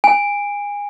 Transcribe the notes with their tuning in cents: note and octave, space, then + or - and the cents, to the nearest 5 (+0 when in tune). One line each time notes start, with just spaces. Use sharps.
G#5 -25